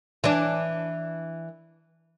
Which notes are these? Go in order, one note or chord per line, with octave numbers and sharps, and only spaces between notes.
E3 D4